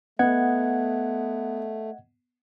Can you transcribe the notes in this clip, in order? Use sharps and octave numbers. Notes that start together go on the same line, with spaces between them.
A3 B3 D#5 F#5 G#6